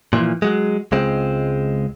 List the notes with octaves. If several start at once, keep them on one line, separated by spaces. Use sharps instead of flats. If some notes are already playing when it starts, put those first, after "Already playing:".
A#2 E3 F3
F#3 G#3
C#2 G#3 C4